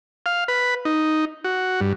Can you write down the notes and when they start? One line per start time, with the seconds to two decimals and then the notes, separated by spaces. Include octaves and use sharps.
0.26 F5
0.48 B4
0.85 D#4
1.44 F#4
1.81 G2